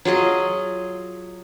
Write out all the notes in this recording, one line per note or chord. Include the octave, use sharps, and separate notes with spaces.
F#3 F4 G#4 D#5